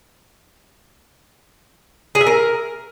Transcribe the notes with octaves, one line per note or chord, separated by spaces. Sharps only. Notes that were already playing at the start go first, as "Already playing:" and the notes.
G#4
E5
A#4